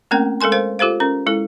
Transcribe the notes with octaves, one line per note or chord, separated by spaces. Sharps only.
A3 A#3 C4 C#4 A#4 G5
G#3 A4 A#4 G#5 C6
A#4 C5 F5
F4 G4 A4 C5 F5
C#4 A#4
G#3 E4 A4